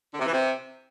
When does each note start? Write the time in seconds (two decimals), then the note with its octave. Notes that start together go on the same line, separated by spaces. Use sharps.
0.13 D3
0.19 C3
0.26 E3
0.32 C3